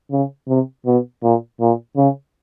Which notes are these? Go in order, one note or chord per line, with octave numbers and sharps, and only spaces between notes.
C#3
C3
B2
A#2
A#2
C#3